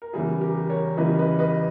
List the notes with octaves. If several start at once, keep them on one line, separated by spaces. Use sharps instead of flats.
A#4
E2 C#3 E3 G3 G#4
G4 A#4
A#4 C#5
E2 C#3 E3 G3 B4 D#5
B4 D#5
B4 D#5